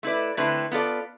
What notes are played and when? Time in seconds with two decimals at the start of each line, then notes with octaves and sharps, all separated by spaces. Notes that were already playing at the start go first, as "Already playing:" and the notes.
0.03 A3 E4 B4 D5
0.37 D3 A3 C4 E4 B4
0.72 B3 F4 A4 D5